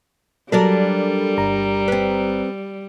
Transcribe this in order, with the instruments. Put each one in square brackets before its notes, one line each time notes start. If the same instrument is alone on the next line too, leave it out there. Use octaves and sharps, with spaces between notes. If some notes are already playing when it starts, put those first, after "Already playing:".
[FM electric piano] F#3 A4 [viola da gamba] G3 [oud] D4 A#4 D5
[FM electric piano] G1 A#5
[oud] C4 B4